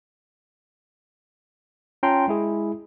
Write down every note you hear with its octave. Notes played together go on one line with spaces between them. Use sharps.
C#4 F4 G5 A5 A#5 C6
G#3 E4 G#4